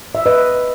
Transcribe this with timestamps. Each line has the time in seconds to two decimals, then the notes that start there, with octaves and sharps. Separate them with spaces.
0.15 E5
0.26 B4 D#5